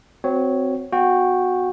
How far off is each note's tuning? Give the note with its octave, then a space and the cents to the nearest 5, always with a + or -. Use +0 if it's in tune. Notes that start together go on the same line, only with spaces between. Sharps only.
C4 -15 F#4 +0 C#5 +0
B3 +20 F#4 -15 G5 +0